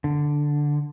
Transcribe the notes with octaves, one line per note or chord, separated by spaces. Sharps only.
D3